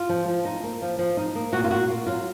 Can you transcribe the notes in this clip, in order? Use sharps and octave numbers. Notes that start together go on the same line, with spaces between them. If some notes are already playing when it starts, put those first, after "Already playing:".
Already playing: F4
F3
F3
D#4
A#3
F3
F3
D#4
A#3
A#2 F#4
F4
A#2 F#4
A#3 F4
F#3 F4